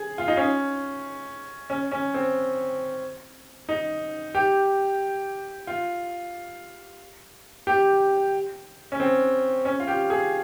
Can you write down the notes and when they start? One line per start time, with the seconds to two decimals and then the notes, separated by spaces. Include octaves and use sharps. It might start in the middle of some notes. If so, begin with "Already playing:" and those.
Already playing: G#4
0.18 F4
0.28 D#4
0.37 C#4
1.70 C#4
1.92 C#4
2.14 C4
3.69 D#4
4.35 G4
5.67 F4
7.67 G4
8.92 C#4
9.00 C4
9.65 C#4
9.80 F4
9.88 G4
10.10 G#4